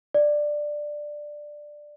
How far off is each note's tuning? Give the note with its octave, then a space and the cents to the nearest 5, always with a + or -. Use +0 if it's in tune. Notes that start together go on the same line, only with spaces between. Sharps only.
D5 +10